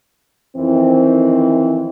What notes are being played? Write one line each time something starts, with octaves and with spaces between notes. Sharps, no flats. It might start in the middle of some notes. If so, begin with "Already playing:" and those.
F2 D#3 E3 C4